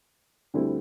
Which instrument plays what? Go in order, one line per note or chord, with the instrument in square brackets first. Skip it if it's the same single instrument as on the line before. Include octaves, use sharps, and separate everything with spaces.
[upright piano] D2 D3 G3 C4 E4